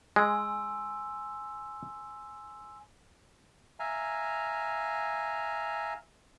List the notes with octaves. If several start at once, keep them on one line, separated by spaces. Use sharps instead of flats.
G#3 G#5 C6 E6
E5 F5 G#5 A#5